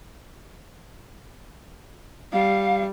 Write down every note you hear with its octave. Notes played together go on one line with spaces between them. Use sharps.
G3 F5